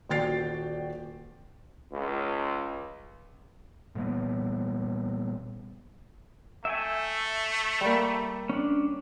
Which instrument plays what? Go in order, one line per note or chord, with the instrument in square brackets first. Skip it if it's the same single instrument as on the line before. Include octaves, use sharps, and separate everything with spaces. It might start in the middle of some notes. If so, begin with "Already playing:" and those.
[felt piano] D#1 F#4 D5 G5 A6 C7
[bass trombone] C#2
[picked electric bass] A#2 G3 A#3 B3
[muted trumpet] A3 [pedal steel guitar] E5 G5 G#5
[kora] G3 A#3
[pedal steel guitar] C#4 D4